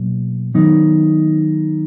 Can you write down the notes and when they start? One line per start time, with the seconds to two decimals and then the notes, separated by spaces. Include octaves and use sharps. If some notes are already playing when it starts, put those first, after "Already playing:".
Already playing: B2 F#3 A#3
0.54 D#3 F#3 B3 D#4